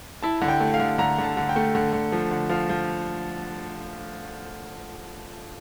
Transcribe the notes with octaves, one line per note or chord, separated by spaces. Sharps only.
E4 A5
D3
G5
A3
F5
D3
D3 A#5
D3
A5
D3
G5
A3
D3
D3
F3
D3
F3 F5
F3